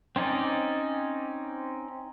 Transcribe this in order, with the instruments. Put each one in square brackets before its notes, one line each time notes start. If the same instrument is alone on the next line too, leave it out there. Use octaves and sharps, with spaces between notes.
[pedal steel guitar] C4 C#4 D#4 D5